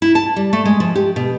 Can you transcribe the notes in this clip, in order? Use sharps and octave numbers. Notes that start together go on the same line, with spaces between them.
E4
A5
G3
A3
G#3
F3
G4
B2